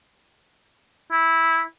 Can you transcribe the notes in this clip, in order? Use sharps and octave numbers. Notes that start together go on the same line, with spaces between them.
E4